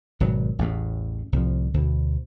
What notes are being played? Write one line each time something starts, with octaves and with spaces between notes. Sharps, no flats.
G#1 B2 F#3
A1 E2 A2
C2 A2 F3
D2 B2